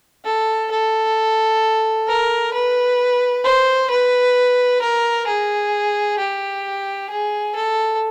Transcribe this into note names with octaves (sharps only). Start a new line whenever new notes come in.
A4
A4
A#4
B4
C5
B4
A#4
G#4
G4
G#4
A4